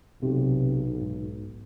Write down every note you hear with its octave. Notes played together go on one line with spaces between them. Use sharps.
B1 C3
G#2